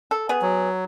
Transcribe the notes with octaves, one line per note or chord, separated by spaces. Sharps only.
A4
B3 G#4
F#3